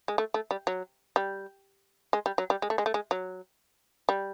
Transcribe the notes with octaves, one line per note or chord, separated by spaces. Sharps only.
G#3
A3
A3
G3
F#3
G3
G#3
G3
F#3
G3
G#3
A3
G#3
A3
G#3
F#3
G3